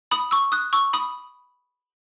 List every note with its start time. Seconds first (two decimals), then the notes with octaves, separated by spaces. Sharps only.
0.11 B5 D#6
0.31 C#6 E6
0.52 D#6 F#6
0.73 C#6 E6
0.93 B5 D#6